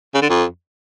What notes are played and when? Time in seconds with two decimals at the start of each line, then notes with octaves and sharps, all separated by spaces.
0.14 C#3
0.22 D3
0.30 F2